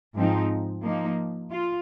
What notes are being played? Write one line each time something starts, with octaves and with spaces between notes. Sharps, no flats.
G#2 F3 G#3 C4 D#4
F3 A#3 D#4
F4